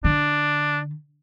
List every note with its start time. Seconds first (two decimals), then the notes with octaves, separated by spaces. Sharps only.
0.04 D3 D4